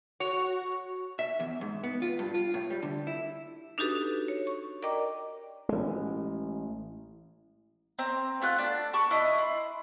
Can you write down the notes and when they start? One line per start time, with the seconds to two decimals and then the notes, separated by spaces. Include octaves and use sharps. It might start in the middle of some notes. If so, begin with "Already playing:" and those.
0.20 F#4 C#5
1.19 E5
1.40 E2
1.61 G#2
1.83 B3
2.02 F4
2.19 G2
2.34 F4
2.54 A2
2.70 G3
2.82 D3
3.07 E4
3.78 D4 D#4 F#4 G4 A4 B4
4.28 C#5
4.47 C#6
4.83 A#4 D5 D#5 G5 A#5 D6
5.69 A1 G#3
7.99 C4 A#5
8.42 A3 F4 F#5 F#6
8.58 D4
8.93 A5 B5 C#6 D6
9.10 D4 E4 D#5
9.38 B5 C6